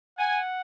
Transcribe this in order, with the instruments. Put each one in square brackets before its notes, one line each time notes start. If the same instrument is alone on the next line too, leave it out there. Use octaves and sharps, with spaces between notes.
[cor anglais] F#5 [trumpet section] G#5